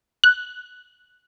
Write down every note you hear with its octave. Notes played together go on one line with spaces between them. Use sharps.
F#6